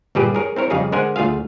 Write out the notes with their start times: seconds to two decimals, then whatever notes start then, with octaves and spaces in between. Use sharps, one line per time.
0.15 G1 A#2 G3 G4 G#4 B4
0.35 G#4 A#4 C#5
0.56 C4 E4 A#4 C#5
0.70 F2 C#3 G3 D#4 G#4 F5
0.92 D3 G#3 A#4 C5 F#5 G#5
1.16 D2 A3 F4 G#4 F5